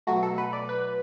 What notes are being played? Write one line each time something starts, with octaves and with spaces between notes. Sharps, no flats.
B2 F#3 A3 F#4
A4
B4
D5
B4